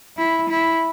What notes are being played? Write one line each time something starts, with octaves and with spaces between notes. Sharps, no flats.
E4
E4